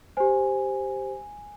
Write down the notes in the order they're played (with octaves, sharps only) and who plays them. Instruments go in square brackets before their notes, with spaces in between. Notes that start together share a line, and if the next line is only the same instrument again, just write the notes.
[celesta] G4 C5 G#5